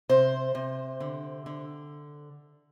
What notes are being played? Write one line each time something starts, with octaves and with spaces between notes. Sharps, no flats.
C3 C5
C3
D3
D3